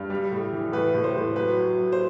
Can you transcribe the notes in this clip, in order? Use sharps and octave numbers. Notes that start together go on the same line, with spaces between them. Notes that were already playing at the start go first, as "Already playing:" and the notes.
Already playing: G2
G3
A2
E3
A2 B4
A2
C5
A2
F#3 B4
F#3
F#3
C5